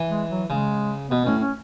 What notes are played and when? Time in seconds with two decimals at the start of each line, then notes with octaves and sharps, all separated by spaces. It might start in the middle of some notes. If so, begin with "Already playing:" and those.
Already playing: E3
0.10 G#3
0.30 F#3
0.50 C#3 G#3
1.10 B2 B3
1.25 A2 C#4
1.41 C#4